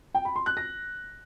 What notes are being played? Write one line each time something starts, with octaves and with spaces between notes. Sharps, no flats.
G5
B5
C6
F#6
A#6